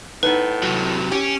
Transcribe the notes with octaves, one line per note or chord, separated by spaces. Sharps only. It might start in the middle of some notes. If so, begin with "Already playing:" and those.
A2 B3 D#4 B4
C3 F#3
C#4 G4